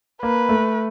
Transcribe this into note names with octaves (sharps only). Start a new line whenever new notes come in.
A#3 B4
A3